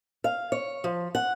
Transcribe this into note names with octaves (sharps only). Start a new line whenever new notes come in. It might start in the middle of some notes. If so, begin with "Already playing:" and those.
F5
C#5
F3
F#5